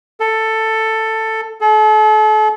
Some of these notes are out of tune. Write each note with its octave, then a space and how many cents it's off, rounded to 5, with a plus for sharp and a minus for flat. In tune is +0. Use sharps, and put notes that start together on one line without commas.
A4 +10
A4 -40